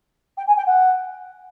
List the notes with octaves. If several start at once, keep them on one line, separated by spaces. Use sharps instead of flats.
G5
G#5
G5
F#5